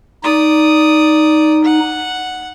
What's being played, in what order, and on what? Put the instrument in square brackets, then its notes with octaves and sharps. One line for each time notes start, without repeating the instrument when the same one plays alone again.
[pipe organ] D#4 [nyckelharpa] D5 D#6
[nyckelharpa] F#5